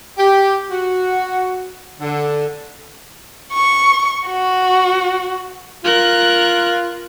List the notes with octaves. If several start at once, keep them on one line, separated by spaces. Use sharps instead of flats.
G4
F#4
D3
C#6
F#4
F4 A#4 F#6